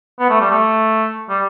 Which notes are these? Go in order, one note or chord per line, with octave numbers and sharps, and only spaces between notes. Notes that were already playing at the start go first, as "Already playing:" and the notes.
B3
A3
G3
A3
G3